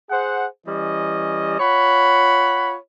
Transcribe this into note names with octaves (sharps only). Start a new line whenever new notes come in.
G#4 C5 F#5
E3 G3 C#4 D#5
F4 C#5 F#5 B5